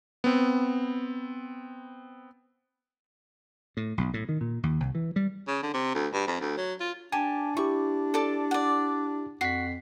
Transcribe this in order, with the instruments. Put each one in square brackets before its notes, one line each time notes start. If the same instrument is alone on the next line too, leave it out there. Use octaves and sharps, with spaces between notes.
[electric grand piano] B3 C4
[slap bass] A2
B1
A2
D#3
A#2
D#2
C2
E3
G3
[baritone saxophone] C#3
D3
C3
D2
G2
F2
D2
F#3
F4
[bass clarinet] D4 [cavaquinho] G4 [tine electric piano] G#5 A5
[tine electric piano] E4 G4 [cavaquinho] C#6
[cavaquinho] A4 D5
D5 F#5
[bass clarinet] F2 [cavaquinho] F#4 [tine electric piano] B6 C7